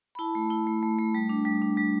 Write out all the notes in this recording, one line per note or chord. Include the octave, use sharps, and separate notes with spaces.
B5
E4 A5
A3
E4
A3
A3
A3
G3
D4
G3
D4
G3